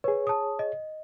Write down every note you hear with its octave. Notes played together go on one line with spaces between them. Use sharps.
G#4 B4 C#5
A5 D#6
D#5